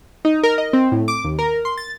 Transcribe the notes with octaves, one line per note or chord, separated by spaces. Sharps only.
D#4
A#4
D#5
C4
A2
D6
D#2
A#4
C6
A6